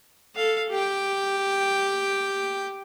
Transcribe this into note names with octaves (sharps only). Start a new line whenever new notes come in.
A4 F5
G4 G5